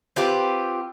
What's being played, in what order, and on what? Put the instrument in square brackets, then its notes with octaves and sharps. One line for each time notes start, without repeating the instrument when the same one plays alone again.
[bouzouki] C4 F4 G4 B4